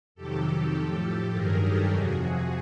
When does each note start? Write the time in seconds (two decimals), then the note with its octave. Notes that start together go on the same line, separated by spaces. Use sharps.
0.15 F2 C3 D#3 F#3 G4 A4
0.73 A2 F3
1.31 G2 D#3 F#3 G#4 A#4
1.60 G4 A4
1.89 F2 C3 F3 F#4 G#4